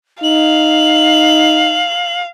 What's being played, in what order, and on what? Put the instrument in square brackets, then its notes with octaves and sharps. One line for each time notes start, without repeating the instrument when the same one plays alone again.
[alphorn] D#4 [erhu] F5 [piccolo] F#7